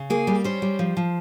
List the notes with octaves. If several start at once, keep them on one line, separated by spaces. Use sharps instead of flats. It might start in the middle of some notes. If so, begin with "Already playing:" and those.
Already playing: C#3
A#3 G#4
G3
C#4 C5
G3
F3
F3